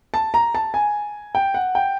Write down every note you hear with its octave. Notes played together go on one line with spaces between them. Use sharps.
A5
A#5
A5
G#5
G5
F#5
G5